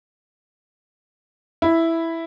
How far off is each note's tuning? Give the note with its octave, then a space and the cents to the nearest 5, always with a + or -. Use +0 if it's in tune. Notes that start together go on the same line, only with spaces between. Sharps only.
E4 +0